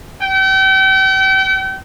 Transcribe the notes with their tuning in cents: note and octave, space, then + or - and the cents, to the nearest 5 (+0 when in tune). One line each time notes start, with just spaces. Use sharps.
G5 -40